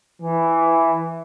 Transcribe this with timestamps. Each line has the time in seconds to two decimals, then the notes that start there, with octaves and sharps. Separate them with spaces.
0.21 E3